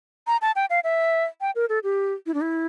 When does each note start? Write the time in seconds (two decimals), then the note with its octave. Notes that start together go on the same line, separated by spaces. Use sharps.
0.27 A#5
0.42 A5
0.56 G5
0.70 F5
0.84 E5
1.41 G5
1.55 A#4
1.69 A4
1.84 G4
2.26 E4
2.34 D4
2.41 E4